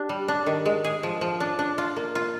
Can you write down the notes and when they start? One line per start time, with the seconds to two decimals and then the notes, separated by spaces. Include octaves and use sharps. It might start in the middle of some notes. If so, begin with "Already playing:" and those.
Already playing: D4 G4
0.09 G3
0.28 D4
0.46 D#3
0.66 G#3
0.84 G#4
1.03 F3
1.21 F3
1.40 D4
1.59 D4
1.78 F4
1.96 A#3
2.15 F4